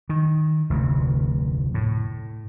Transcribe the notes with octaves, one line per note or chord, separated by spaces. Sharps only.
D#3
F1 D2 C3
A2